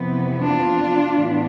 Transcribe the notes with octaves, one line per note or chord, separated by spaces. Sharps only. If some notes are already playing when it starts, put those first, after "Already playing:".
Already playing: F2 C3 E3 B3
D4 F4
A2 E3 B3